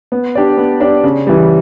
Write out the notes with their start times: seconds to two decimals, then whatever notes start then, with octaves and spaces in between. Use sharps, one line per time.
0.12 B3
0.35 D4 G4 D5
0.57 B3
0.80 D4 G4 D5
1.04 C#3
1.27 E3 G3